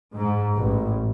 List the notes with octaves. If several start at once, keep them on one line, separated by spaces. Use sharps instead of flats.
G#2
A1